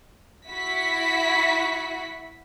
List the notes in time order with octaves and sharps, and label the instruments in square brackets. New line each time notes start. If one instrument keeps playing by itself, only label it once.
[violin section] E4 F#4 B6